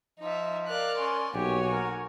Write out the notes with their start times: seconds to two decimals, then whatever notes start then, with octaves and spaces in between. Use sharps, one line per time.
0.20 F3 D#4 E5
0.68 A#4 D5 F5 F#6
0.99 C#4 G#5 C6
1.34 B1 A#3 F#4 G4 C#5 G#5
1.72 A#4